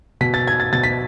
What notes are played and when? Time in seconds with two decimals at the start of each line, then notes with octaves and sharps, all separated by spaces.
0.21 B2 B6
0.34 A6
0.47 G#6
0.60 A6
0.73 B2 A6
0.83 B6